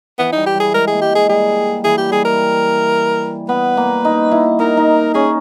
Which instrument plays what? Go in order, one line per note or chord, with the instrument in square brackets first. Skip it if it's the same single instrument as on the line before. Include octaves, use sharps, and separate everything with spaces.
[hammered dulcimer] E3 [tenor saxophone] B3
[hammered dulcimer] G3 [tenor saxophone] D#4
[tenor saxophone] G4
[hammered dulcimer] G3 [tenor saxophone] G#4
[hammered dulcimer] G#3 [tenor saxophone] A#4
[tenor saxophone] G#4
[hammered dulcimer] A#3
[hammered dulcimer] G#3 [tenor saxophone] G4
[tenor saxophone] G#4
[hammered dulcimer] G3 [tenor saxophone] G#4
[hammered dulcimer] E3 [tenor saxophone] G#4
[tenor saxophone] G4
[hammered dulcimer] G3 [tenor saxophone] G#4
[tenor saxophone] A#4
[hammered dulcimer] B3 [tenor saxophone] B4
[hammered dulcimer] A#3
D#4
E4
[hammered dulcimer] D#4 [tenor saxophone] A#4
[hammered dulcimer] D#4
[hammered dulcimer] C#4 [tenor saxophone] G#4